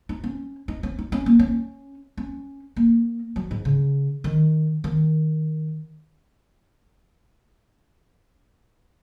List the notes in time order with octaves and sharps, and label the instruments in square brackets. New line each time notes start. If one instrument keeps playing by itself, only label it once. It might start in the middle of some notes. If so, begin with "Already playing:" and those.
[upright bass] D#4
C#4
D#4
C#4
D#4
C#4
A#3
C#4
C#4
A#3
F#3
G#2
C#3
D#3
D#3